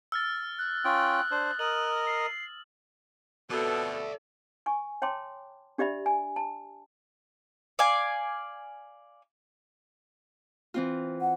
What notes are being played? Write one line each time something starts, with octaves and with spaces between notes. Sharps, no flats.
E6 F6 A6
F#6
C#4 F4 G5 D#6
D4 C5
A#4 D#5 F#7
C7
F2 B2 A4 D5 E5
G#5 C#6
C#5 G5 A5 C6 D6
D4 G4 D5 E5 B5
G#5
A5
D5 F5 G#5
E3 C4 F4
F#5